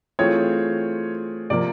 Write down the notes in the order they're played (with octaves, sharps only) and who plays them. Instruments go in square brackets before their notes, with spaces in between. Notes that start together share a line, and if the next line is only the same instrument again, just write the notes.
[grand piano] E3 A3 C4 F4 G#4 [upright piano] C#5
[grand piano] C3 F3 A#3 [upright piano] D5